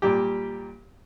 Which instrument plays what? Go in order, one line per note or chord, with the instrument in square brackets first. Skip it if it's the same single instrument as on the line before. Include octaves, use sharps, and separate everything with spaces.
[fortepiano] A#2 G3 G4